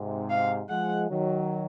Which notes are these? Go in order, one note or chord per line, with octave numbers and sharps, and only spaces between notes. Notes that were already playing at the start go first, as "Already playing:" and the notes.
Already playing: G#2 C3
F5
F3 G#3 F#5
D#3 F#3